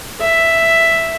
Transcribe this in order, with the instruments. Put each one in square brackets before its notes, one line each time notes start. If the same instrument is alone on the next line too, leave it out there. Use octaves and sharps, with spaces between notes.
[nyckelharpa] E5